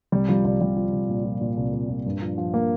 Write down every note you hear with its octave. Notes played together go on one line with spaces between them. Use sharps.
C2 G3
F3 G3
C2 G3
C2 G3
F3
C2
A#2
F3
A#2
C2
C2
A#2
G2
F3
F3
A#3